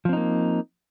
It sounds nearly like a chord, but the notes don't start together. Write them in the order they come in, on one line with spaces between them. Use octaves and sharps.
F3 C4 D#4 A#3